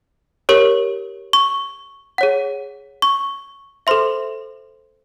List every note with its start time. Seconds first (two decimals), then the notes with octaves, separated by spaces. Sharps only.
0.49 G4 A#4 C#5
1.33 C#6
2.18 G#4 C#5 F#5
3.02 C#6
3.87 A4 C5 E5 C6